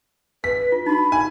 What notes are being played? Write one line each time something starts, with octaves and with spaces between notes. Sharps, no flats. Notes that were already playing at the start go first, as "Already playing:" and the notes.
B4 B6
F4
D#4 F#4 B5
G#5